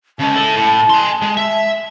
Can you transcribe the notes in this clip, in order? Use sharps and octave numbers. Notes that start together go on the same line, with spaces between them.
C#3 G#3 A5
E4 A4
A2
G#5 C6
G#3
E5